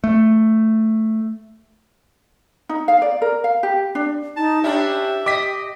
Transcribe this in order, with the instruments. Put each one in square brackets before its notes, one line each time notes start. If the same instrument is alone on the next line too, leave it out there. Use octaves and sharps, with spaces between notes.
[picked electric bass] A3
[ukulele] D#4
F5
D5
A#4
F5
G4
D4
[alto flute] D#4 [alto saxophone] A5
[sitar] C#4 D4 E4 [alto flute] G4 [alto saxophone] E5
[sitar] D#5 [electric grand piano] D6 B6